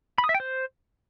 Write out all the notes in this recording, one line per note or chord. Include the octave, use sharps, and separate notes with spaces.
B5
D#6
E5
G5
C5